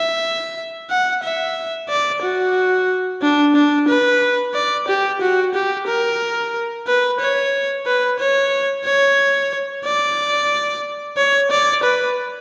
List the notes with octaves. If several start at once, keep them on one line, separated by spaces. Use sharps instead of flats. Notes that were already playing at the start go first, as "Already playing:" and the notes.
Already playing: E5
F#5
E5
D5
F#4
D4
D4
B4
D5
G4
F#4
G4
A#4
B4
C#5
B4
C#5
C#5
D5
C#5
D5
B4